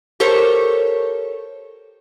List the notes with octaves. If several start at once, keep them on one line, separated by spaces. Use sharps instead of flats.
G4 A4 A#4 C5 C#5